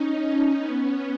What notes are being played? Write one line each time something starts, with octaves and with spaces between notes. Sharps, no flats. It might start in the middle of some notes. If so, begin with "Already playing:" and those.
Already playing: C#4 D#4
B3 C#4